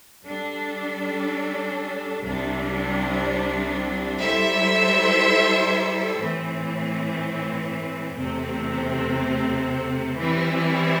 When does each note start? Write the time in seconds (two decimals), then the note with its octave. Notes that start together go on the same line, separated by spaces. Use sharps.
0.24 G3 D4 A4
2.23 C2 C3 G3 D4
4.20 G3 E4 A4 C5 E5
6.19 A2 E3 C4
8.18 E2 C3 A3 C4
10.16 E3 G3 C4 E4